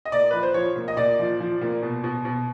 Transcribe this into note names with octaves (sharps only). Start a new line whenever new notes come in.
D#5
A#2 D5
F3 B4
C5
F3 C#5
A#2
D#5
A#2 D5
F3
F3
A#2
B2
B2
B2